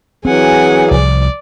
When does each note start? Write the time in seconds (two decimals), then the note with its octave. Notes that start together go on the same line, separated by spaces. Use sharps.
0.25 E3 F#3 C4 G#4 F#5 G#5
0.91 C2 F3 D5